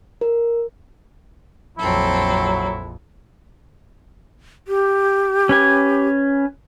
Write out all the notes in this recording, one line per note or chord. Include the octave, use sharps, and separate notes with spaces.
A#4
A#1 F2 F#3 C4 E4 A4
G4
C#4 B4 G#5